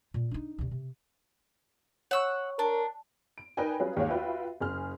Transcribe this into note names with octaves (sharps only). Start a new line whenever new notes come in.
A#2
D4 D#4
D2 C3
C3
C#5 F#5 C#6 E6
D4 A#4
D7
D#4 A#4 B4 D5 G5 G#5
F#3 G3 C#4 F4 G#4 B4
D#2 G#3 C#5 F5
F4 F#4 B4 E5 F5 G5
F#1 G#4 F6